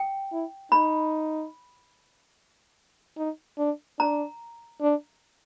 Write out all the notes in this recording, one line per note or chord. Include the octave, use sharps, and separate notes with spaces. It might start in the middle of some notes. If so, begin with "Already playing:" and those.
Already playing: G5
E4
D#4 B5
D#4
D4
D4 A#5
D4